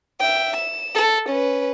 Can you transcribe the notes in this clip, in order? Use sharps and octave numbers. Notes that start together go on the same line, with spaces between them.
E5 G5
E7
A4
C#4 B4